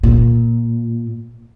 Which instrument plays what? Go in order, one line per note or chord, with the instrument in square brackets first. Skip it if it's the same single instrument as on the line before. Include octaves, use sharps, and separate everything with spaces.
[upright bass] A#2